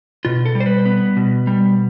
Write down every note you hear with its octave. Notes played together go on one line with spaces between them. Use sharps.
B2 F4
A4
G3
C5
B4
B3
B2
G3